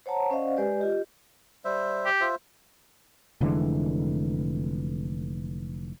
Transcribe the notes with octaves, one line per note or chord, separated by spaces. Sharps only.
C5 C#5 F#5 A5 A#5
C#4 C5 D5 D#5 F5 F#5
G#3 G4 B4 D5
F4 G4 D#5
G3 C5 E5
G4
F4 C5 E5
F1 D3 E3 G#3